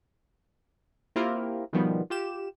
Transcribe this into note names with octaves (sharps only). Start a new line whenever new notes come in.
A#3 C4 E4 F4 G4 A#4
B2 D#3 F3 G3 B3
F4 G4 E7